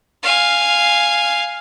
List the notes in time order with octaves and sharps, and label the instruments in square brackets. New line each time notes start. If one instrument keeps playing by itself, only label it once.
[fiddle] F5 G#5